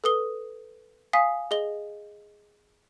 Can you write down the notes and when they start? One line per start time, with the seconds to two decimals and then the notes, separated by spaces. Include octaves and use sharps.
0.04 A4 B4 D#6 G7
1.13 F5 G#5 D#6 B6
1.51 G#4 D#5 G7